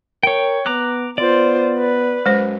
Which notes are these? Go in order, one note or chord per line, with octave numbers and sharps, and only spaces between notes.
A#4 C#5 G5
B3 A#5 D6 F#6
B3 F4 C5 D5
B4
F#2 G#3 C5